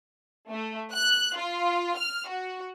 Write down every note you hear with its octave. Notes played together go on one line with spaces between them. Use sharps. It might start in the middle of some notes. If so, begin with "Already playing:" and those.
A3
F#6
F4
F6
F#4